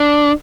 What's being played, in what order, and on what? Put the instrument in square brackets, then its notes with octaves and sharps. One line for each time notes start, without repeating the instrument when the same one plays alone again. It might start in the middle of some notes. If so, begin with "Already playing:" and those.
Already playing: [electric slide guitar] D4